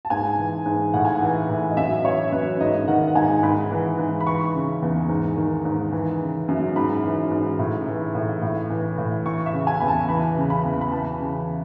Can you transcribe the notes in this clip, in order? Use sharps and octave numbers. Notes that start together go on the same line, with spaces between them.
A5
G#2 G#5
E3
G#2
A2 F#5
G#5
F#5
E3
A2
D#5
F#2 E5
E3 C#5
F#2 B4
G#2 D#5
D#3 F#5
F#5
G#2 G#5
G#2 B5
E3
G#2
B5
E3 C#6
C#3
E2
G#2
D#3
G#2
E3
C#3
F#2
G#2 B5
E3
G#2
A2
E3
A2
A2
E3
A2
E3 C#6
E5
C#3
G#5
E2 B5
A5
E3 B5
C#3
B5
E2
B5
E3 A5
C#3